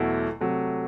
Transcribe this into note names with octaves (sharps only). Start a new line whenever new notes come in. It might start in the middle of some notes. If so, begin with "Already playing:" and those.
Already playing: E2 B2 F#3 A3 E4
C3 F#3 A3